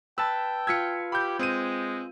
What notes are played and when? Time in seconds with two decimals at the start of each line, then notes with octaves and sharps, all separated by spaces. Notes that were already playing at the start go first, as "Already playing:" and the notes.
0.18 B4 G5 A5 E6
0.67 F4 E6 G#6 B6 C#7
1.12 G4 B5 G6
1.39 G#3 C4 D#7